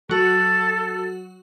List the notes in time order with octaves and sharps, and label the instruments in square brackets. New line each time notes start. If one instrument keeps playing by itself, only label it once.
[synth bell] F#3 F#4 [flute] A4